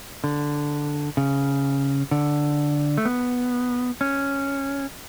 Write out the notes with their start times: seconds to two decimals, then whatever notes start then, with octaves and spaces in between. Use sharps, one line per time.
0.24 D3
1.17 C#3
2.11 D3
2.98 A3
3.05 B3
4.01 C#4